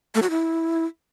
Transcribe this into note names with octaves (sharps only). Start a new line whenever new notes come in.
A3
F#4
E4